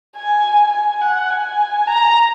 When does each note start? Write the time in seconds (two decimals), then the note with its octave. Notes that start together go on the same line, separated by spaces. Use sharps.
0.17 G#5
0.73 G#5
1.01 F#5
1.30 G#5
1.87 A#5